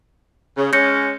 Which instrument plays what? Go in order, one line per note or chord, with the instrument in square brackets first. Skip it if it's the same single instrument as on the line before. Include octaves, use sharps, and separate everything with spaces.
[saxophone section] C#3
[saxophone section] G#3 C#4 [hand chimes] G6 A#6 C#7